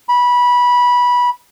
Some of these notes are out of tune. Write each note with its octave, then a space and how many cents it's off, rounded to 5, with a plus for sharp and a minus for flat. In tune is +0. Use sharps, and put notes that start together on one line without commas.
B5 -15